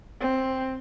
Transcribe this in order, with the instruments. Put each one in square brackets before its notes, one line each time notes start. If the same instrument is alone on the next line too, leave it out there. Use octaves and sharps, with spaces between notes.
[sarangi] C4